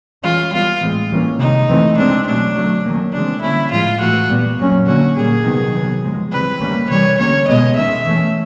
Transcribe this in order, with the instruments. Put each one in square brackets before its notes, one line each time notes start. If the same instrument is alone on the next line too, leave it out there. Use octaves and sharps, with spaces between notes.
[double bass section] E3 G#3 C#4 [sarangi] F4
[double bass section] E3 G3 B3 [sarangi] F4
[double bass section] A2 E3 G#3 C4
E3 G3 A#3 C#4
[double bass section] C3 D#3 G#3 [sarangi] D#4
[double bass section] C#3 E3 A3 C4
[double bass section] C3 E3 G#3 C4 [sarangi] D4
[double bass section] B2 F#3 A3 C#4 [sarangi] D4
[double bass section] D3 F#3 A3
D#3 F#3 A#3 C#4
[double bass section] C#3 E3 G#3 C4 [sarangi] D4
[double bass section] D3 G3 A#3 C#4 [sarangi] E4
[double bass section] A2 F3 G#3 [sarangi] F4
[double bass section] A2 E3 A3 [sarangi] F#4
[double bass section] A#2 G3 B3
A#2 F#3 A#3 C#4
[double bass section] D3 F#3 A#3 C#4 [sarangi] F#4
[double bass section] A#2 G3 A#3 [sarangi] G#4
[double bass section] C3 D#3 F#3 B3
C3 D#3 F#3 B3
C#3 F3 G#3
[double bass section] C#3 E3 G3 C4 [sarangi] B4
[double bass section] D#3 G3 A#3 C#4
[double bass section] C3 E3 G3 [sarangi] C#5
[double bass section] D3 G3 A#3 C#4 [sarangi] C#5
[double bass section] B2 G#3 B3 [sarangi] D#5
[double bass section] D#3 G#3 C#4 [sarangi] E5
[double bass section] E3 A3 C#4